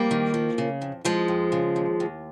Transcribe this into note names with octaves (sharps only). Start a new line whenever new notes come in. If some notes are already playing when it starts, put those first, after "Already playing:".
Already playing: F2 G3 A#3
D#3
F3
C#3
F2
F2 F3 G#3
F2
C#3
D#2
D#2